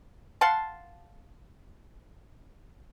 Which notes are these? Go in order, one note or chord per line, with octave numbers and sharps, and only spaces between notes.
F5 F#5 A5 C6